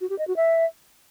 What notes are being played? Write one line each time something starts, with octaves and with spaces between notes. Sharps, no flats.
F#4
G4
D#5
F#4
E5